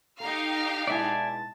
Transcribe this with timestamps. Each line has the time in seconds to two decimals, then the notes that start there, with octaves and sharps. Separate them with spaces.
0.20 D#4 G4 A4 F5 A#5
0.87 B2 G#3 E4 D5 E5 G#5 A5